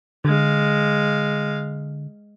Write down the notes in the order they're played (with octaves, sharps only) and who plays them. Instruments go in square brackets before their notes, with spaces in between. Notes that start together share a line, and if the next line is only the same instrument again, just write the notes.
[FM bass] D3 [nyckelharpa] G#3 F5